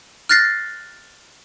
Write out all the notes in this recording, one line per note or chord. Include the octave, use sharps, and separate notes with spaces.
F6 F#6 A6 A#6 C7